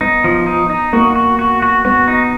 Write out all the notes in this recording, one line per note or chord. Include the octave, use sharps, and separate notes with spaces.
B3 D#4
F3
D#4
D#4
A#3 F#4
F#4
F#4
F#4
B3 F#4
D#4